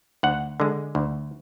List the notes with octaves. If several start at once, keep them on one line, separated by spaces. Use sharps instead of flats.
D2 F#5
D3 G#3
D2